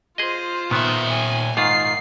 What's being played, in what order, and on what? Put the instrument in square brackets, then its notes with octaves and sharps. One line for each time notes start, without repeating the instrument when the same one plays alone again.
[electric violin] F4 C5 [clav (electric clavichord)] G#4 D#5
[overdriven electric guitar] A#2 E5 [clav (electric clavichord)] D#3 B3
[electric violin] G#5
[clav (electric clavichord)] G#2 D#3 F4 [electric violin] C7